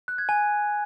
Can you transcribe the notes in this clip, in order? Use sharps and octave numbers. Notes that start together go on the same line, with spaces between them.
F#6
G#6
G#5